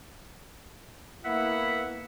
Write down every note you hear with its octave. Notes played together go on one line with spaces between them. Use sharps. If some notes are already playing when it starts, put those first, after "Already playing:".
A#3 B3 E4 E5 F#5